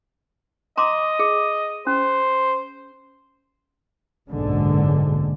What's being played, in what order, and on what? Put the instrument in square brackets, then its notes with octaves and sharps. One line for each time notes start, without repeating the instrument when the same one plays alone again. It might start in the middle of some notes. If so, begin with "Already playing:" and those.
[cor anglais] D#5 [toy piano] A#5 C6 D6
[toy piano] G#4
[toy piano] C#4 [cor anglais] C5
[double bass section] F#1 B1 G#2 D3 G#3